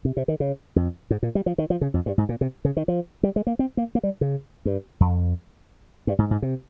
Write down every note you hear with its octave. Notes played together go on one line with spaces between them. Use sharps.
C3
C3
D#3
C#3
F2
G#2
A#2
G3
F3
D#3
F3
C#3
F2
G2
G#2
A#2
C3
C#3
D#3
F3
G3
G#3
A#3
C4
A#3
A#3
G3
C#3
G2
F2
G2
G#2
G#2
C3